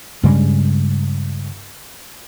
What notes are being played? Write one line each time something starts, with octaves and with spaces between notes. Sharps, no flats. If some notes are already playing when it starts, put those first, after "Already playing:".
G2 C#3 G3 G#3